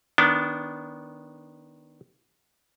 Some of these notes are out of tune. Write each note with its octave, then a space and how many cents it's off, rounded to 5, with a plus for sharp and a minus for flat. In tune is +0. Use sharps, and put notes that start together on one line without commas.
D#3 +0 B3 -5 D4 -25